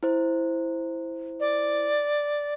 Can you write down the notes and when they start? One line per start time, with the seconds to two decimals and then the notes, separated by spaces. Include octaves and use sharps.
0.03 E4 C5
1.40 D5